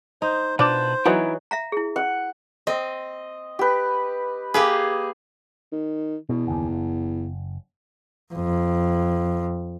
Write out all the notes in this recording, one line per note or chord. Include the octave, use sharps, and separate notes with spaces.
D#4 C5
B2 D4 F4 B4 C5 D5 A5
E3 F#3 B3 D#4 E4 C#5 F#5
E5 F5 A#5
E4 G#4
F#5
C4 D#5
G4 B4
A#3 G4 G#4 B4
D#3
E2 B2
F#1 D#2
F#1
F2